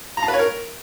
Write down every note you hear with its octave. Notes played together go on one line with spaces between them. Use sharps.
A#5
A5
B4
C#5
A#4